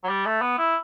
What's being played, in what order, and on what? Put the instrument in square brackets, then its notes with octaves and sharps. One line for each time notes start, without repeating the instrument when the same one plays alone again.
[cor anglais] F#3
G3
A3
B3
E4